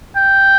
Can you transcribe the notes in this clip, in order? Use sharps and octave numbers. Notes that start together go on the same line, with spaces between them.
G5